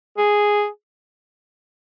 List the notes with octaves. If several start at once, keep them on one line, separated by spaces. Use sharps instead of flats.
G#4